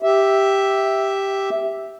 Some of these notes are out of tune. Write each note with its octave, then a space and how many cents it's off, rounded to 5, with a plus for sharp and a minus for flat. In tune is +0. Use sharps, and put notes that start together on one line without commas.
G4 +0 E5 +0